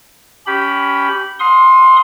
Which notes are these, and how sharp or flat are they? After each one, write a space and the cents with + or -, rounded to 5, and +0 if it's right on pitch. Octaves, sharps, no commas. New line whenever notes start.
C#4 +20 G4 -15 B5 +0
F5 +45 C6 +5 D#6 +15